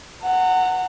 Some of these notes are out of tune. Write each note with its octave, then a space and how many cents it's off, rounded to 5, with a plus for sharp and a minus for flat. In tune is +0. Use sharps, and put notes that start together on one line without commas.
F#5 +0 A#5 -40